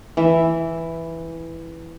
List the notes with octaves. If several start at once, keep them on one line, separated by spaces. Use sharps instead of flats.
E3 E5